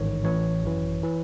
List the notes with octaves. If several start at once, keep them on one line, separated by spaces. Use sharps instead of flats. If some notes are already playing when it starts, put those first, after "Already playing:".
Already playing: A1 G#2 D#3 C#5
A1 A2 E3 C#5
G#1 F#2 E3
E3